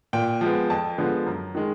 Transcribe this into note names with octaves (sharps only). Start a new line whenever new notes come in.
A#2 G5
F3 G#3 B3
F2 A5
D3 F3 G#3 B3
F#2
D#3 G#3